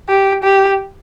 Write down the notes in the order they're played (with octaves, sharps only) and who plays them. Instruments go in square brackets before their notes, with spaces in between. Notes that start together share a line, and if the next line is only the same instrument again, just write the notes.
[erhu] G4
G4